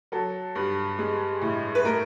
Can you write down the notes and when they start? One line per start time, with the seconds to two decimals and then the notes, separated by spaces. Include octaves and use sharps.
0.12 F#3 A4
0.55 G2
0.98 G#3
1.42 A2
1.75 B4
1.85 A3 A#4